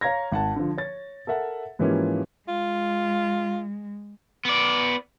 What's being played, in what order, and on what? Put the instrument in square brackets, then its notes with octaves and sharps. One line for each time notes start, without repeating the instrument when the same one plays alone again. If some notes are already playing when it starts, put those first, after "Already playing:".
[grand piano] C#5 F5 A#5 G#6 A#6
G#1 F#5 A5
D3 F3
C#5 A6
A4 A#4 E5 F#5
G#2 E3 F3 A#3 C#4 G4
[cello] G#3 [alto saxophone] F4
[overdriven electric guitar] B3 D5